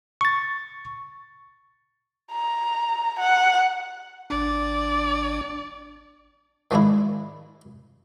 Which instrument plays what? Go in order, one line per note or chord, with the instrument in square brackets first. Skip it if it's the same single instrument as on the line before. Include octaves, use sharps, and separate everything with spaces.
[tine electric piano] C#6 A6
[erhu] A#5
F#5
[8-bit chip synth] G#1 D4 [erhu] D5
[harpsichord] D#3 F3 G#3 D4 E4